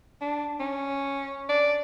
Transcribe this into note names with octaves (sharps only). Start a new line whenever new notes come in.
D4
C#4
D5